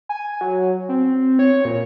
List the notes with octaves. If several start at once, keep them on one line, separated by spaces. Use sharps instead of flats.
G#5
F#3
C4
C#5
A#2